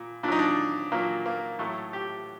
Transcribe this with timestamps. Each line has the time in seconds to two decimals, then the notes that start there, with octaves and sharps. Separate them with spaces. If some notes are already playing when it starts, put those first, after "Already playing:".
Already playing: A#2
0.23 A#2 D4
0.28 F#3 D#4
0.39 D4
0.92 A#2 F#3 A#3
1.26 A#3
1.59 A2 F#3 A3
1.93 G4